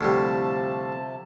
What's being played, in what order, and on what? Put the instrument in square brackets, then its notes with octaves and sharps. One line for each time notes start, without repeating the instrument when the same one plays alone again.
[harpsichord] D2 A2 G3 [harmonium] C3 F3 A5